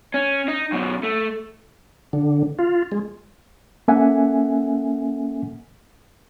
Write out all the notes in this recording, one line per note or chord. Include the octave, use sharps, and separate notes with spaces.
C#4
D#4
F#2 B2
A3
D3
F4
G#3
A#3 C#4 A4 E5 F#5 G#5